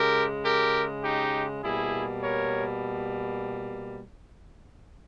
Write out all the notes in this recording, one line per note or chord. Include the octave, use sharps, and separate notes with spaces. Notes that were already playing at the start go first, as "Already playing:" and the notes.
Already playing: C#3 G#3 G4 A#4
G4 A#4
D#4 G4
B2 G3 A#3 E4 G#4
A#4 C#5